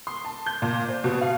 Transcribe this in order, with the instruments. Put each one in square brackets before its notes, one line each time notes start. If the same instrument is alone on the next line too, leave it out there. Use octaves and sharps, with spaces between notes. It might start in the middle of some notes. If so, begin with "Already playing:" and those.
[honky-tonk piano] C6
A5
G6
A#2
C5
B2
F5